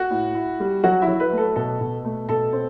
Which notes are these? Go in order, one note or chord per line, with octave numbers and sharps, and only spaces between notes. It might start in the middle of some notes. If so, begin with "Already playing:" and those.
Already playing: F#4 F#5
A2
E4
G3
F#3 F#4 F#5
E4 E5
F#3
B4
A3
A4
B2 A4
B2
A3
B2 A4 A5
C4